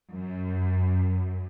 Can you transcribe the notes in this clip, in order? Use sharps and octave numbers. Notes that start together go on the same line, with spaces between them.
F#2